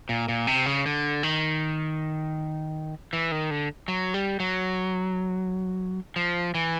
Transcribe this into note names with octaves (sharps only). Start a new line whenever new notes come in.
A#2
A#2
C3
C#3
D3
D#3
E3
D#3
D3
F#3
G3
F#3
F3
E3